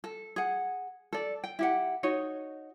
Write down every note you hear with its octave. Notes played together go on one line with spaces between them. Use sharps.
A4
G#4 F#5
A4 D5
G5
E4 G4 F#5
D#4 F#4 C#5 D#5